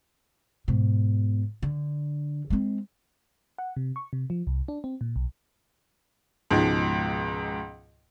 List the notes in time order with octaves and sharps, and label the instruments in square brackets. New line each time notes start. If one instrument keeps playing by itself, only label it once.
[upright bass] G#2 B2
D3
G#3 C4
[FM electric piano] F#5
C3
C#6
C3
F3
C2
D4
C4
A#2
B1
[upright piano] C#2 G#2 B2 F3